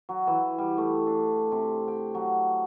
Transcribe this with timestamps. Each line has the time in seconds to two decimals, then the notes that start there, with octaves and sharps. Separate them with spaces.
0.09 F#3
0.27 E3
0.58 G3
0.78 A3
1.07 D4
1.52 C3
1.88 G5
2.15 F#3